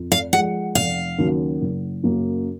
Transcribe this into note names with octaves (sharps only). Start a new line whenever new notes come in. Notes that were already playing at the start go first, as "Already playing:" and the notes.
Already playing: F2
F5
F3 G#3 F#5
F1 F5
D#2 C#3 F#3
F#1
F#2 C#3 F#3 A#3